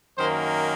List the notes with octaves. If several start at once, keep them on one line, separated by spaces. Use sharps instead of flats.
F#2 D#3 A#3 C5